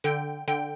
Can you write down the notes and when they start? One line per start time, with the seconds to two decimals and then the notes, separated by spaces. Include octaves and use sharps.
0.04 D3 G5
0.48 D3 G5